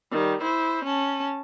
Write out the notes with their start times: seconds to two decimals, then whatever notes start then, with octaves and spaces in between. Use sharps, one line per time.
0.11 D#3 G3
0.41 E4 C5
0.85 C#4 A5